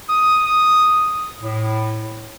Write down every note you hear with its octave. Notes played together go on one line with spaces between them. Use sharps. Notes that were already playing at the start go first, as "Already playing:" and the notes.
D#6
A2